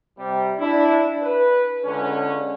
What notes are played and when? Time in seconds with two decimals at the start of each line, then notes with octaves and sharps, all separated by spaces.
0.18 C3 G3
0.59 D4 E4
1.23 B4
1.85 C#2 D3 C#4